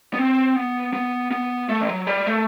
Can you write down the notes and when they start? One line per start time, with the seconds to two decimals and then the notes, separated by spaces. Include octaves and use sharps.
0.14 B3
0.19 C4
0.56 B3
0.93 B3
1.31 B3
1.69 A3
1.81 E3
1.89 F#3
2.07 G3
2.27 A3